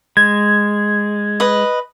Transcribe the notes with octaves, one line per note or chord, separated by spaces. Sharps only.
G#3 G#6
B4 D#5